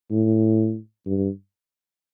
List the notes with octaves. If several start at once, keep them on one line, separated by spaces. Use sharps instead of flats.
A2
G2